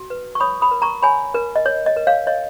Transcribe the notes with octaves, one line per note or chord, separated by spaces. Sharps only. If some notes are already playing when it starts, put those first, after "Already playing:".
Already playing: F#4
B4
C#6
C#5 B5 D#6
B5 D#6
A#4
A#5 C#6
C#5 G#5 B5
A#4
D#5
C#5
D#5
A#4
C#5 F5
C#5 D#5